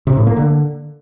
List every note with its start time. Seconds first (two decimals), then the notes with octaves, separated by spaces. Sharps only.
0.07 C3
0.17 A2
0.27 A#3
0.37 D3